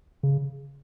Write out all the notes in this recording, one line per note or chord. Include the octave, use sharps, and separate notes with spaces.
C#3